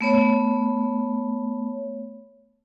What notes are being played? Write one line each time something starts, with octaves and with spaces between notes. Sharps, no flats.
A3 B3 C#5